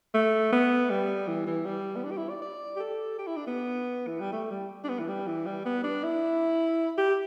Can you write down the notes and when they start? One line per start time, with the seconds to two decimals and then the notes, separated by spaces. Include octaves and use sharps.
0.14 A3
0.52 B3
0.90 G3
1.27 E3
1.47 E3
1.65 G3
1.96 B3
2.04 D4
2.11 G4
2.17 E4
2.30 D5
2.42 D5
2.76 G4
2.80 A4
3.19 G4
3.27 E4
3.37 D4
3.47 B3
4.07 E3
4.20 G3
4.32 A3
4.51 G3
4.84 D4
4.89 B3
4.99 E3
5.08 G3
5.27 E3
5.46 G3
5.65 B3
5.84 D4
6.04 E4
6.98 G4